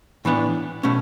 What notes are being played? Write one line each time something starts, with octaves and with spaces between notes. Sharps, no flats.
A2 E3 B3 D4
B2 A3 C#4